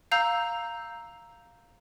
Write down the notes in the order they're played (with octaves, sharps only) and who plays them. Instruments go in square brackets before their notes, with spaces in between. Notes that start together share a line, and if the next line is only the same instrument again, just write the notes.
[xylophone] F5 A#5 E6 G6